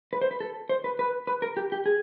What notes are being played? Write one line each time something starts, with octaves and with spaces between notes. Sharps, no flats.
B4
C5
B4
A4
C5
B4
B4
B4
A#4
G4
G4
G#4